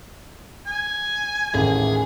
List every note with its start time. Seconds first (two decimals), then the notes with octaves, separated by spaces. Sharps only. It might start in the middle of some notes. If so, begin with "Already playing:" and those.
0.66 G#5
1.54 A1 D#2 A2 G#4